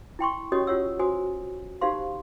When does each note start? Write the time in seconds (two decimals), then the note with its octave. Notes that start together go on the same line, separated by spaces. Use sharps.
0.19 E4 G5 C6 C#6
0.52 C#4 F#4 G4 C#5 D#5 D#6
0.67 F4 C#5 F#5 E6
0.99 F#4 C5 G#5 D#6
1.81 D#4 G4 C5 F5 C6